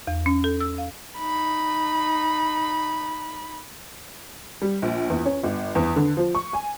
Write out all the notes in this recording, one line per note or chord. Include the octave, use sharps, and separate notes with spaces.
E2
C#4
A4
E6
F5
D#4 B5
G3
A#1
E2
C#4
G1
E2
D3
F3
C#6
G#5